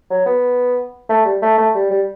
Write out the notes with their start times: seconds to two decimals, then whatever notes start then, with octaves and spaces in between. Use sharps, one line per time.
0.11 F#3
0.26 B3
1.09 A3
1.25 G3
1.42 A3
1.58 A3
1.75 G3
1.91 G3